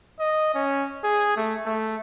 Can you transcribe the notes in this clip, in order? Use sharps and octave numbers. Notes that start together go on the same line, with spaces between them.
D#5
C#4
G#4
A3
A3